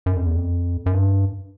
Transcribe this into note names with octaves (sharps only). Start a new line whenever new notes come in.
F#2
F2
E2
F2
F#2
G2